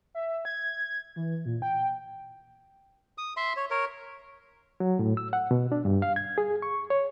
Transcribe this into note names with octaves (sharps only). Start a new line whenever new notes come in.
E5
G#6
E3
A#2
G5
D#6
E5 C6
C#5
A#4 C#5
F#3
A2
E6
F#5
B2
D4
G2
F5
G#6
G#4
C#6
C#5